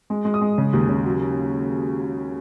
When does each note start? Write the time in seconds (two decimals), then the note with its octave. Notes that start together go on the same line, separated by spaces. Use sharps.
0.10 G#3
0.25 G#3
0.34 D#6
0.41 G#3
0.58 C#3
0.73 D#2
0.89 C#3
1.05 F#3